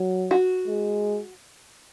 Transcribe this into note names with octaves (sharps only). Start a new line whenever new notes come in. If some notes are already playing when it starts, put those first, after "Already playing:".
Already playing: F#3
F#4
G#3